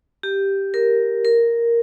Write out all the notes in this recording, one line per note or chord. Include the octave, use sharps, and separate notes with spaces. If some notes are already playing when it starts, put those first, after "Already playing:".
G4
A#4
A#4